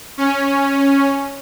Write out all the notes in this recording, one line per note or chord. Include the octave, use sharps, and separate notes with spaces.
C#4